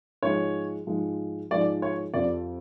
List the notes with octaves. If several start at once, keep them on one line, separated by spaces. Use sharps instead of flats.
G#2 F3 G#3 C#5
G#2 F3 G#3
G#2 F3 G#3 D5
C#5
F2 C3 F3 D5